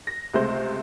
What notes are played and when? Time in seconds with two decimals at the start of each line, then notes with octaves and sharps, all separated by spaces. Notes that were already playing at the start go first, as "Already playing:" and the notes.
0.07 A#6
0.34 C#2 C3 G#3 A3 C5